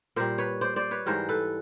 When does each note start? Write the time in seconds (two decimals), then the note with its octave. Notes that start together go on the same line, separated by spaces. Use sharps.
0.16 A#2 G3 A#4 C5
0.38 B4 C#5
0.61 C5 D5
0.76 C5 D5
0.91 B4 C#5
1.06 G#2 E3 G3 A#4 C5
1.29 A4 B4